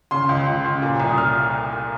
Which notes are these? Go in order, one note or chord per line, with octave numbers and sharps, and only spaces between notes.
C#3 C6
C#2
C#2
C#3
A#2
C2
D#6
F6